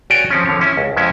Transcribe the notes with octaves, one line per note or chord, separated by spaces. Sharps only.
F#4 C#5 D5 G5 G#5
F3 C4 C#4
D3 F3 C#5
C#4 E4
C#2
F2 G#3 C#4 E4